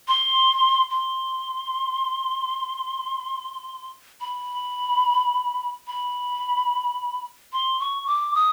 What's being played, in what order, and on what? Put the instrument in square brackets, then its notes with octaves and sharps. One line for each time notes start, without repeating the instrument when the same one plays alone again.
[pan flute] C6
C6
B5
B5
C6
C#6
D6
D#6